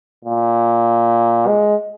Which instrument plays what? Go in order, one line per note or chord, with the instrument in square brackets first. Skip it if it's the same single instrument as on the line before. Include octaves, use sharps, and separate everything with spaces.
[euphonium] A#2
G#3